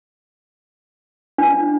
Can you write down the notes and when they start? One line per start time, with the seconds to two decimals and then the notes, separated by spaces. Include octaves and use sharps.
1.38 D4